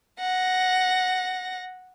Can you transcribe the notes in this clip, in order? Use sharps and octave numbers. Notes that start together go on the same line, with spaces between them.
F#5 A#6